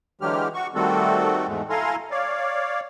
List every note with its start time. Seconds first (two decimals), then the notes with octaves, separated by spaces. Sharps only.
0.21 D3 E3 F#3 G#3 G4 F6
0.54 F#4 C#6
0.75 D#3 G3 A3 C4 F#4 A4
1.47 E2 G#2 G#3 A3
1.70 E4 A4 F5 G#5 A#5 C6
2.11 C#5 D5 F5